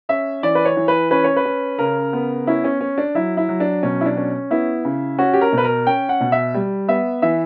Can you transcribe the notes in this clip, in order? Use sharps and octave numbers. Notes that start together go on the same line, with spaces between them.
C#4 E5
E3 D5
B4
C#5
E3
B4
C#4 B4
C#5
B4
C#4
C#3 A#4
B3
C#4 E4
C#4
C#4
D4
F#3 E4
E4
F#3
D4
B2 C#4
E4
D4
C#4
B3 E4
C#3
C#4 F#4
G4
A#4
B2
B4
A#4
C#4 G5
F#5
B2
E5
G3
B3 E5
E3 E5